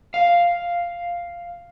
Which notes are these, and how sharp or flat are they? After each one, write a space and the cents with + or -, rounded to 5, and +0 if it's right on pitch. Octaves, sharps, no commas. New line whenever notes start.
F5 +0